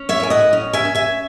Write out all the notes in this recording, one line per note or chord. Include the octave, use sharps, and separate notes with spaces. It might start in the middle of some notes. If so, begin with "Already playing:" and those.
Already playing: C#4
C#5 E5
A2 G#5
D#5 F#5
C#4
E5 G#5
C#4
E5 G#5